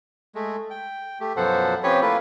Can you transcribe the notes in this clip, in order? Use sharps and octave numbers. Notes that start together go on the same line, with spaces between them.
G#3 A3
G5
A3 G4
F#2 B2 F3 A4 C5 F#5
F3 C4 C#4 G4 B4 C#5
A3 A#3 E4 F4 B4